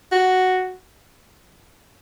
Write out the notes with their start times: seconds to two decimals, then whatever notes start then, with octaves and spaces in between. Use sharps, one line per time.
0.12 F#4